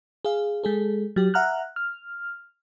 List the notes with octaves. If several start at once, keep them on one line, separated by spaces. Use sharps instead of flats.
G#4 F5
G#3 G#4 A4
F#3 G4
E5 F#5 A#5 F6 F#6
F6